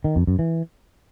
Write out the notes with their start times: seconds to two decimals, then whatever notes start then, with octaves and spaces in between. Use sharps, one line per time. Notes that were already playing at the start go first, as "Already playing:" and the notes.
0.04 D#3
0.16 F2
0.27 F#2
0.39 E3